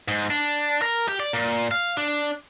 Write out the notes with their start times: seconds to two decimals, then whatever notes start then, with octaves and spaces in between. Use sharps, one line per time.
0.08 G#2
0.30 D4
0.82 A#4
1.08 G4
1.20 D5
1.33 A#2
1.71 F5
1.97 D4